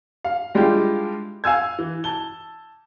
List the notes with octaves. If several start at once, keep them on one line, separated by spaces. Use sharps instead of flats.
F5
G3 G#3 D4 E4 F4 G4
F5 G#5 E6 G#6
E3
A5 G7